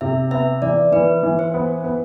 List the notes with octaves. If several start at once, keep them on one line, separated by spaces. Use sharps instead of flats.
C3 E5
B3 E5
E3 D5
E3 B4
E3
C5
B3
B3